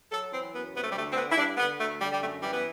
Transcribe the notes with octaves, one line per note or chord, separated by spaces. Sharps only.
F#3 A4
E3 C4
F#2 B3
C3 B3
A3
G3
D2 A3
C4
D3 B3
E4
G2 D4
D3 B3
D2 A3
D3 G3
G3
F#2 A3
E3 G3
B3